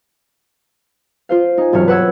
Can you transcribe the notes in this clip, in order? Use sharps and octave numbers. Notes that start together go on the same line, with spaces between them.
F4 C5 F5
D#4 G#5
E1 C2 G2 F#3 C#5 F6
B4 F#5 E6 G#6